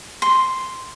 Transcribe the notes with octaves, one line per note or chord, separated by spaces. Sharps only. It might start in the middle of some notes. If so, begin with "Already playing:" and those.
C6